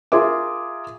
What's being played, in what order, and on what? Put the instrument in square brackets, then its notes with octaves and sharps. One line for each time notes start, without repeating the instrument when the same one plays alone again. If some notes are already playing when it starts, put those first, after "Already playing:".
[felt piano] F4 G#4 A#4 E5 D6